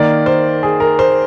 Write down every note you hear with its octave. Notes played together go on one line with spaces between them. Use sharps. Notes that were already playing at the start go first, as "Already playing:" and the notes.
Already playing: D#3 A#3 D5
C5
G#4
A#4
C5